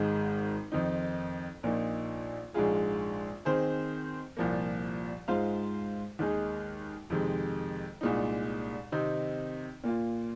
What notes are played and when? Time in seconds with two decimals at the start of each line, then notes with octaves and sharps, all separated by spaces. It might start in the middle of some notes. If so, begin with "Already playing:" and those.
Already playing: G#1 G#2 D#3 G#3
0.72 F2 D#3 C4 D#4
1.63 A#1 A#2 A#3 D#4
2.54 A#1 G#2 G#3 F4 G#4
3.45 D#3 C4 G#4 C5
4.37 C2 A#2 F3 A#3
5.28 G#2 G#3 F4 C5 F5
6.19 D#2 D#3 G#3 D#4 G#4
7.10 F2 C3 D#3 G#3
8.01 C2 A#2 G#3 D#4
8.92 C3 D#3 C4 D#4
9.84 A#2 A#3 F4